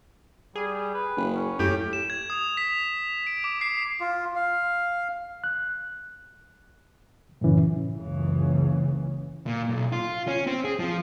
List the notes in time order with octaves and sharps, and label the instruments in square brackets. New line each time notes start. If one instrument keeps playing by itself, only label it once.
[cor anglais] G3 [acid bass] G#4
[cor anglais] B4
[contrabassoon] F#1
[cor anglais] C#4
[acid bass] F#2 [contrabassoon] A2 [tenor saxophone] G4
[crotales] E7
G#6
D#6
B6
D7
D6
C7
[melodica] F4
F5
[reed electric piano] F#6
F#2 A2 C#3 E3 C#4
[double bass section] F#1 C#2 C#3 E3
[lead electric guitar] A#2
B1
F4
C#4
C4
G#4
F3